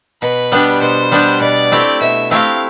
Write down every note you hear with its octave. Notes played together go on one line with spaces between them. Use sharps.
B2 B4
G3 B3 D4 G4
B2 C5
G3 B3 D4 G4
B2 D5
A3 C4 E4 G4
B2 E5
A3 C4 E4 G4 F5